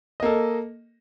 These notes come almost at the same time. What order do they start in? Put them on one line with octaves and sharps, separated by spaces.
D#5 A#3 A4